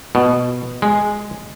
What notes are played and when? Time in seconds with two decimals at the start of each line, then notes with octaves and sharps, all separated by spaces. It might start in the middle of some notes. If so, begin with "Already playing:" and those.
0.15 B2
0.82 G#3